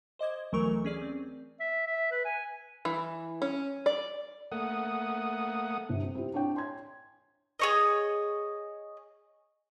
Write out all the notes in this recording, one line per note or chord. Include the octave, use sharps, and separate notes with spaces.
C5 D#5 D6 G#6
D2 E3 F#3 A3 A#4 C#6
C#4 G#4 D5
C4
E5
E5
B4
G#5
E3
C#4
D5
A3 A#3 F#5 D#6
G1 G2 C3
C4
C4 E4 F4 G4
D4 C#5 G5
G#5 C6 G#6
G#4 C#5 D#5